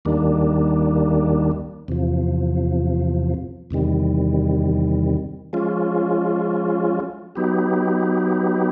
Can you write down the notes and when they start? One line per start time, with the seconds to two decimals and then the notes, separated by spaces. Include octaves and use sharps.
0.05 D#2 D#3 G3 A#3 D4
1.88 E2 C3 F3
3.71 E2 C3 D#3 G3
5.53 F3 G#3 C#4 F4
7.35 F#3 B3 D#4 G4